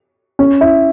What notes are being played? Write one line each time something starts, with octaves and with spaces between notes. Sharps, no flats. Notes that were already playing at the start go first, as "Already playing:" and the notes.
C#4
E4